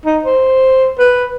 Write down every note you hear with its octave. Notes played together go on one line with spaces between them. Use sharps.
D#4
C5
B4